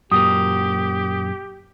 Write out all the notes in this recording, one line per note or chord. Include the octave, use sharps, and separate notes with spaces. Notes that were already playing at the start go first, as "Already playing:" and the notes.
F#2 A#2 A#3 G4 D#6